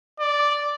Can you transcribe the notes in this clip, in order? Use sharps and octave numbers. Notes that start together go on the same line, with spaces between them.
D5